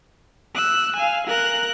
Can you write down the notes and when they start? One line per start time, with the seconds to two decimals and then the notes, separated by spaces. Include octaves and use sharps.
0.55 E6 F#6
0.96 F5 G#5
1.27 A#4 F#6